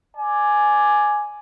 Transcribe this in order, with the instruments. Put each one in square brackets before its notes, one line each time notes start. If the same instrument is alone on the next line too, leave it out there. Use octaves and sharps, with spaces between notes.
[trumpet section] D5 G#5